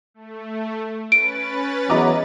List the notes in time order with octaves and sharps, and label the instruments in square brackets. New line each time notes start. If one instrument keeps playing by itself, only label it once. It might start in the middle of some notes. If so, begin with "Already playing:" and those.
[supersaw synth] A3
[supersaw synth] C#4 B4 A6 [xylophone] D7
[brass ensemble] E2 F#3 [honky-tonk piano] D#5 A#5 D6